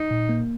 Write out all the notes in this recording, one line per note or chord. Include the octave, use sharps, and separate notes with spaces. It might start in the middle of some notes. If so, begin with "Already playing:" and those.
Already playing: D#4
A#2
A#3